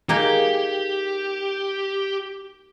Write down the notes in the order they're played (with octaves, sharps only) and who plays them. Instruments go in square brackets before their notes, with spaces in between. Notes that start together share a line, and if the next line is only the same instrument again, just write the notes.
[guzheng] A#3 D#4 G#4 [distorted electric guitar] G4